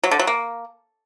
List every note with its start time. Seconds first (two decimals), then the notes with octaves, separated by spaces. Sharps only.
0.03 F#3
0.11 D3
0.19 F#3
0.27 A#3